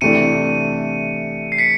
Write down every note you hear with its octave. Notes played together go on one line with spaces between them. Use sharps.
C3 E3 A3 D4 C#7 D#7
C7
B6 C#7